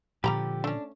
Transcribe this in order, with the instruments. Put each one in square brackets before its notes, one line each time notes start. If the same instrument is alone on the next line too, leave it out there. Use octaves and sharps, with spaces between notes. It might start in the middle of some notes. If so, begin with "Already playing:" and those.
[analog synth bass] A#2 [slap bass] D3 F3 [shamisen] G3 A#5 B5 [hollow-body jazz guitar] G4
[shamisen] A3 C#4 [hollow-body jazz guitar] D4